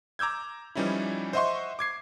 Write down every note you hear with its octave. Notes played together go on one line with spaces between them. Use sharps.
A#5 D6 E6 G6 G#6
E3 F3 G3 C#4 D#4 E4
C5 D#5 E5 F#5 C6 C#6
D6 G#6 C7